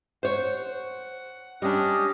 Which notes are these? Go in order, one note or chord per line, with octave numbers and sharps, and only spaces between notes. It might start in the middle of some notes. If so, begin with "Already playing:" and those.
C5 C#5 F#5
G3 C#4 D4 G4 D#5